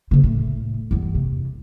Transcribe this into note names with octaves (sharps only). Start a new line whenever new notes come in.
C#3 F3
A2
E2 G2
C3